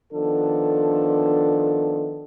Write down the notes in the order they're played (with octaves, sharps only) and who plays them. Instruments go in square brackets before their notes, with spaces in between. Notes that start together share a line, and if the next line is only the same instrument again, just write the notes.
[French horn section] D#3 F3 B3 D4 A4